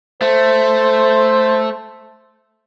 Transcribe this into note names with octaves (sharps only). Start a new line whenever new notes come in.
A3 C5